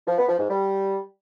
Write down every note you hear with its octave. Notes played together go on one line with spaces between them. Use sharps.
F3
B3
F3
G#2
G3